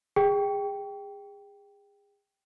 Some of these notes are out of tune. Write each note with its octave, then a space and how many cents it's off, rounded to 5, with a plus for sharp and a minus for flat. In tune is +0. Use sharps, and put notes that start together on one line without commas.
G#4 -30 G5 +0